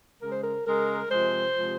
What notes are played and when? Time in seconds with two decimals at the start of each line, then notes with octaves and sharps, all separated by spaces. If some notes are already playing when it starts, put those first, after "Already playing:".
0.21 C#3 G#3 A#4
0.32 C5
0.44 A#4
0.65 C#3 G#3 A#4
1.09 C3 F3 G#3 C5
1.54 C3 F3 G#3